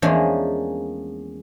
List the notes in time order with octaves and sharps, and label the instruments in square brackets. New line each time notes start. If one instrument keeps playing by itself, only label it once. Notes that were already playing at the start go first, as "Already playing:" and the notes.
[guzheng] E2 F3 G#3 A#3 C#4 D4